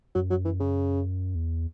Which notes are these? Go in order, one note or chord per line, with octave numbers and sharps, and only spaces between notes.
F#2 F#3
F#3
E3
C#3
E2